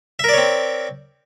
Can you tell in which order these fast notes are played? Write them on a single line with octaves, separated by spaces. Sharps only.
E5 A#4 D5 C#5 C4